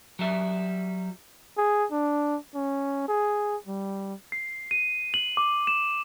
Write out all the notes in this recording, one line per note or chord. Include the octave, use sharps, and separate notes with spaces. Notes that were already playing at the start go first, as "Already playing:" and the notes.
F#3 G3 E5
G#4
D4
C#4
G#4
G3
C7
D#7
F#7
D6
E7